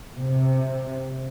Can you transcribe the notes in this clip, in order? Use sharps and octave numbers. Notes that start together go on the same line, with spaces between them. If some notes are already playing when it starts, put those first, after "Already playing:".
C3